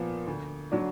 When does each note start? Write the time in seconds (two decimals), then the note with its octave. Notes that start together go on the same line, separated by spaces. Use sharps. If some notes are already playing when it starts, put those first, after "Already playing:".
Already playing: A#2 F3 B3
0.27 D2
0.72 D3 F#3 D4